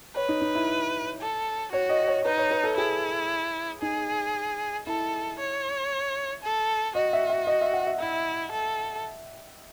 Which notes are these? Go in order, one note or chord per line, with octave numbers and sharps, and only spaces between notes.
B4 C#5
D#4
D#4
E4
A4
F#4 C#5
D#5
C#5
D#4 B4
C#5
B4
A4
E4 G#4
D#4 G#4
E4 A4
C#5
A4
F#4 D#5
E5
E5
D#5
E5
F#5
E5
E4 E5
A4